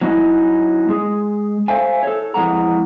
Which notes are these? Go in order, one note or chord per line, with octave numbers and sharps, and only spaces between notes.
F#3 A3 C#4 D#4 E4 F#4
G#3 G#4
A4 C5 D5 E5 F5 G#5
A4 C#5
F2 E3 G#3 F#5 A#5